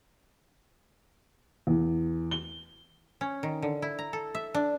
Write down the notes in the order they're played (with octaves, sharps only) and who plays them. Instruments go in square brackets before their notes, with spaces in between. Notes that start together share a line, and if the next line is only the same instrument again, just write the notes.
[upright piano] E2
G7
[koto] C#4
D#3
D3
E4
A#5
A4
E5
D4